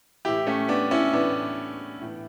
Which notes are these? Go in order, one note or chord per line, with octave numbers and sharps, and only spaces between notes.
A2 E3 E4 G4
A3 C#4
B3 D4
C#4 E4
A2 E3 B3 D4
A2 E3